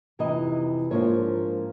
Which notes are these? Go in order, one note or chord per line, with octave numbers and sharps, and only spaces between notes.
F2 C3 E3 D#4 D#5
G#2 F3 A#3 C#4 D4 F4 C#5